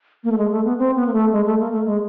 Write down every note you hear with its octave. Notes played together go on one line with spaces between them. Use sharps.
A#3
A3
G#3
A3
B3
C4
B3
A#3
A3
G#3
A3
A#3
A3
G#3